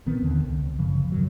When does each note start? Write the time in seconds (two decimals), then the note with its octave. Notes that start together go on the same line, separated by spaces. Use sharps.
0.06 A#1 D#3 B3 C4
0.22 D#2 D3
0.44 C#2
0.79 G1 F#2 C#3 F3
1.12 F#2 B2 D#3 F#3